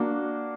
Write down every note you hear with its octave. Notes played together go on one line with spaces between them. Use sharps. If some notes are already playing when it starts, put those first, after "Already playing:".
Already playing: A#3 D4 F#4